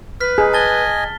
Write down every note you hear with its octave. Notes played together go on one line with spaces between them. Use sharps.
B4 F6 B6
D#4 G#4
D#5 G#5 A5 A6 G7